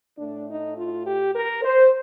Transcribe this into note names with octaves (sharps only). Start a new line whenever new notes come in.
A2 A3 D4
D#4
F4
G4
A#4
C5